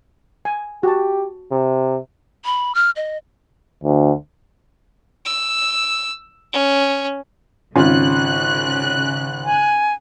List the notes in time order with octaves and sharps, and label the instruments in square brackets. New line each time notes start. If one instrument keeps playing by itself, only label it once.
[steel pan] G#5
[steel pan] F#4 A5 [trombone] G4
[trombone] C3
[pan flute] B5
F6
D#5
[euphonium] D2
[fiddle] E6
C#4
[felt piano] G#1 C#4 F4 [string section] C#3 F#6
[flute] G#5